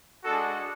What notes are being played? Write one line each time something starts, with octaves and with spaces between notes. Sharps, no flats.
G#3 D4 F#4 A4